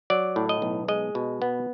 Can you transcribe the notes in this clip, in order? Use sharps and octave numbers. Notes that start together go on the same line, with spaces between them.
F#3 D5
A2
D#5
B1
G#3 D#5
B2
B3